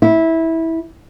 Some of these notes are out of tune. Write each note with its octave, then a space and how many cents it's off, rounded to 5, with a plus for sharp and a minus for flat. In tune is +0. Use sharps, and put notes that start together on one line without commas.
E4 -15